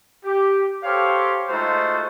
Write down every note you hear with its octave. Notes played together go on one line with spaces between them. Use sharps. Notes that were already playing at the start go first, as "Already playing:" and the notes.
G4
G4 A4 C5 C#5 F5
G#3 A3 D#4 F4 F#4 C5